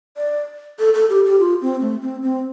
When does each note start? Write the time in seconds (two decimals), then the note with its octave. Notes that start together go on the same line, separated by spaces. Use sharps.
0.17 D5
0.79 A4
0.94 A4
1.09 G4
1.25 G4
1.40 F4
1.62 C4
1.81 A3
2.02 C4
2.23 C4